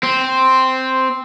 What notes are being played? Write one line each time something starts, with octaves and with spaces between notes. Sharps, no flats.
C4